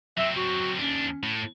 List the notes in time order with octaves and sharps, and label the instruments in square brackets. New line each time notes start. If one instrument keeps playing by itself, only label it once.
[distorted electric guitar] F#3 C4 [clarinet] E5
[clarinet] F#4
[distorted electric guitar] D#2 D4 [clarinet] C#4
[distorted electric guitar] A2